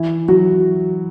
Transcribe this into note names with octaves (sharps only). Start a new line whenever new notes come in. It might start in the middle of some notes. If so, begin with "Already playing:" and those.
Already playing: E3 E4
F#3 F#4